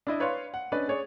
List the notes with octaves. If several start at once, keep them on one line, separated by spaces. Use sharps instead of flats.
D4 E4 D#5
B4 C#5 D5 F5 C6
F#5
C#4 D4 B4 D5 D#5
G#4 C#5 D5